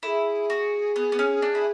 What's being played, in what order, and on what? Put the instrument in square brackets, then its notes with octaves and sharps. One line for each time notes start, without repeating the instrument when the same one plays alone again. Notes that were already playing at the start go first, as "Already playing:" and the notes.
[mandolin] E4 [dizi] A4
[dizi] G#4
[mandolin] F#4
B3
B3
C#4
D4
E4